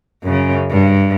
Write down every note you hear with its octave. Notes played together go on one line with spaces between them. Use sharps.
F#2 C#3
G2